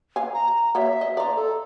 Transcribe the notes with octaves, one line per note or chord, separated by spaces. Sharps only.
F5 G#5
A#5
F#3 A#3 E5
D#5
F3 D5 A#5
A4